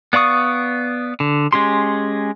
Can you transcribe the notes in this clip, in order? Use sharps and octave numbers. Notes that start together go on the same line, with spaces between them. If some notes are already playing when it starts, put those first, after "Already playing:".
B3 D5 F5 C#6 D#6
D3
G#3 C#4 G4 C6